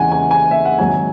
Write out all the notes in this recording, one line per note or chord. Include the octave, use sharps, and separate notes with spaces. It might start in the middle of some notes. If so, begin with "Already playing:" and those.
Already playing: E2 C#3 E3 G#3 F#5 G#5
G#5
G#5
E5
F#5
G#1 G#2 F#3 G#5